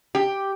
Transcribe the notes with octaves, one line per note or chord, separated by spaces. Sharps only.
G4